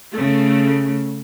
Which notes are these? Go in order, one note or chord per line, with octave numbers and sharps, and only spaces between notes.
C#3 A3